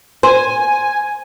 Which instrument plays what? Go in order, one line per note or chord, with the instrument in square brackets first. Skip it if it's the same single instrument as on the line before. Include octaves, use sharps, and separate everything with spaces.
[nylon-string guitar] C5 [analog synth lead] G#5